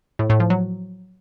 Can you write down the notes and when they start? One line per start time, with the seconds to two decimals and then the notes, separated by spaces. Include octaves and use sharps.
0.19 A2
0.30 A2
0.40 F3
0.50 F#3